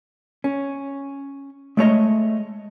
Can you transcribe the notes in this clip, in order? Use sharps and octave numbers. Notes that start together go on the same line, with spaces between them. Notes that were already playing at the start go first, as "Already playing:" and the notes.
C#4
G#3 A3 C#5 D#5